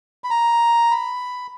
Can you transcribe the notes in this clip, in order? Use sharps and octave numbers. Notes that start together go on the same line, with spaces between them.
B5
A#5
B5